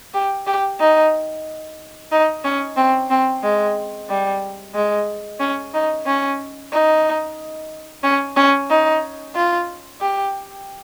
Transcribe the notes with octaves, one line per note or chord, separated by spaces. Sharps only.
G4
G4
D#4
D#4
C#4
C4
C4
G#3
G3
G#3
C#4
D#4
C#4
D#4
C#4
C#4
D#4
F4
G4